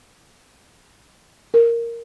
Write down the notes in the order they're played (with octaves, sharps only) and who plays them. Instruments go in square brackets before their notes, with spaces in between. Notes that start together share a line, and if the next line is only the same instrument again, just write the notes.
[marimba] A#4